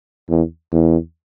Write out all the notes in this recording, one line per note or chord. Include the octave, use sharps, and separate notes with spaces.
E2
E2